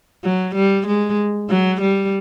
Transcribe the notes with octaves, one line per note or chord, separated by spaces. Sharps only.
F#3
G3
G#3
F#3
G3